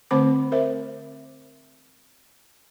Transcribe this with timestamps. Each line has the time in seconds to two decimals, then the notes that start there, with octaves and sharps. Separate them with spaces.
0.11 D3 A3 C4 C5 B5 D6
0.52 A#4 C5 E5